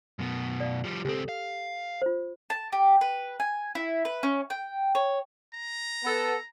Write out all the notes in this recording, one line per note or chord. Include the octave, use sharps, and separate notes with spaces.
F#2 B2
D5 F5
F3 G3
C#2 C4 G4 A4
F5
F4 C5
A5
G4
B4
G#5
E4
B4
C#4
G5
C#5
A#5
B3 A4